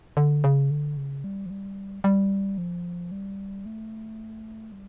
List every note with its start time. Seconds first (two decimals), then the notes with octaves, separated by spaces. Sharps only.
0.17 D3
0.44 C#3
0.71 D3
0.97 C#3
1.24 G3
1.46 F3
1.50 G3
2.04 G3
2.58 F3
3.12 G3
3.66 A3
4.72 G3